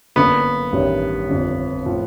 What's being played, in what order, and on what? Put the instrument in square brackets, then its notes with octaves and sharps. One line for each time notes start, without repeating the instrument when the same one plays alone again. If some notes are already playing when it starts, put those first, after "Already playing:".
[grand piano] G1 F#2 D3 F#3 A#3 [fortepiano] B3
[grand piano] A1 G2 D#3 G3
G1 F2 D3
A2 F3